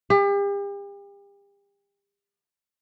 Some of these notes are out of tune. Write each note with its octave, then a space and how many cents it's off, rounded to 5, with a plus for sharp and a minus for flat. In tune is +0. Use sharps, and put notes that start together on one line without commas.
G4 +40